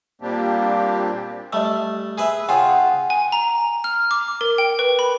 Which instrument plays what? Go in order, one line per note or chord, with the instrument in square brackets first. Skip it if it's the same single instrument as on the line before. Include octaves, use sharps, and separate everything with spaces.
[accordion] A#2 G3 A#3 C4 D4 G4
[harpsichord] G3 A3 [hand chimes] D#5 E6
[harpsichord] G#4 B4 E5
[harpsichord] C#3 F4 G#4 [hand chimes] F#5 G5
[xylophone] G#5
A#5
F6
D6
A#4
G5
B4
B5